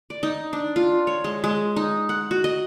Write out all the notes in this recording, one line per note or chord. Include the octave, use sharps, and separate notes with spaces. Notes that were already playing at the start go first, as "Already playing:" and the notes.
D5
D#4
D4
F4
C#5
G#3
G#3
D#4
F#5
F#4
D#5